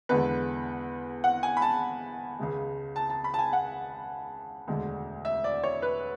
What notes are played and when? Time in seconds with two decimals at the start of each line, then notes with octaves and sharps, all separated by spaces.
0.09 E2 D3 G#3 B4
1.24 F#5
1.43 G#5
1.57 B5
1.62 A5
2.39 C#2 C#3 G#3
2.96 A5
3.10 A5
3.24 B5
3.34 A5
3.39 G#5
3.53 F#5
4.67 E1 D2 D3 G#3
5.25 E5
5.44 D5
5.63 C#5
5.82 B4